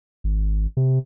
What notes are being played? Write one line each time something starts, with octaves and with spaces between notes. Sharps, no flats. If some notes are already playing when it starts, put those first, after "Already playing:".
G#1
C3